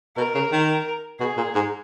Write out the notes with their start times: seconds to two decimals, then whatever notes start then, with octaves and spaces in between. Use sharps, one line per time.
0.17 B2 A#4
0.35 C#3
0.52 D#3
1.20 B2 G#4
1.37 A#2
1.55 G#2